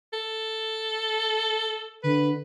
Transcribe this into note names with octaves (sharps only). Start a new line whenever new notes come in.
A4
D3 B4